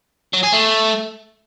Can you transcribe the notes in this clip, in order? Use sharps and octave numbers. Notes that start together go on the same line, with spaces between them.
F#3
G#4
A3